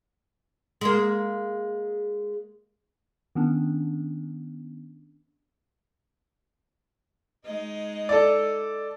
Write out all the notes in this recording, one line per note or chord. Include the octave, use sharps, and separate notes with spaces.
G#3 A#3
D#3 B3 C#4 D4
G#3 D#4 D#5
A4 D5